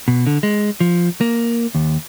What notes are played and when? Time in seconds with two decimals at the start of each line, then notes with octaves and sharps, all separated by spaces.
0.08 B2
0.27 D3
0.43 G#3
0.80 F3
1.21 A#3
1.75 D#2